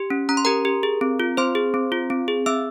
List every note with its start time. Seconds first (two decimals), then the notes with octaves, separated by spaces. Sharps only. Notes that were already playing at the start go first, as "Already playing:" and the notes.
Already playing: G4
0.10 C#4
0.29 C#4 A#5
0.37 C6
0.45 G4 A#4 A#5
0.65 G4
0.83 G#4
1.01 C4
1.20 F4
1.37 C4 C5 C6
1.55 G#4
1.74 C4
1.92 F4
2.10 C4
2.28 G#4
2.46 C4 E5 E6